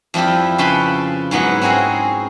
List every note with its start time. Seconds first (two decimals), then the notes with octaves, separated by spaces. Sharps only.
0.14 F2 F3 G3 E4 G4
0.58 C#3 C#4 B4 A5 B5 C6
1.31 G#2 F#3 B3 E4 F#4
1.62 C4 C#4 F#4 G#4 A#4 C5